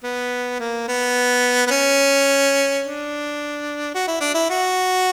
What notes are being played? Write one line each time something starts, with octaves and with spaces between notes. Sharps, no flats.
B3
A#3
B3
B3
C#4
D4
F#4
E4
D4
E4
F#4